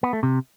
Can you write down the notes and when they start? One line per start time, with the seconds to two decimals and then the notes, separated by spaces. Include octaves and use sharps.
0.03 B3
0.13 A3
0.23 C3